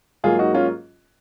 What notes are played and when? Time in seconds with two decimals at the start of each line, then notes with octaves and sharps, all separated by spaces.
0.24 G#2 F#3 A#3 F4 G#4
0.39 D#4 F#4
0.54 C#4 F4